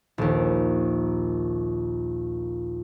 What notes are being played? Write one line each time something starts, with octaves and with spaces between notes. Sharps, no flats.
A#1 D#2